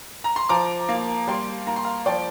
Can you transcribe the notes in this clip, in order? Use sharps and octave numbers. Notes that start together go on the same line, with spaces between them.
A#5
C6
F3 A#5 D6
A#3
G3 G5 C6
A#3 A#5
C6
F5 A#5
F3 D5 G5